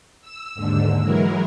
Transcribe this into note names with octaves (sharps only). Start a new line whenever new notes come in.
E6
D#2 G#2 D3 E6
E3 F#3 G#3 E4 A#4